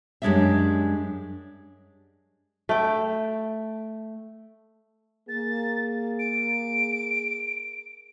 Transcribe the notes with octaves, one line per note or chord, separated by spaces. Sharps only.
F#2 G3 G#3 D4 D#4 E5
A3 G5
A#3 G#4 A6
D7